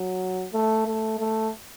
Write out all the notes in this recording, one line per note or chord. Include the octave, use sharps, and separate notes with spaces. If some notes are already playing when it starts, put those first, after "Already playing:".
Already playing: F#3
A3
A3
A3